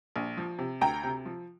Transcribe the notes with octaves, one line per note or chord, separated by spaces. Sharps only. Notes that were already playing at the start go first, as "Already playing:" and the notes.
A#1
F3
C3
D2 G5 A#5
C3
F3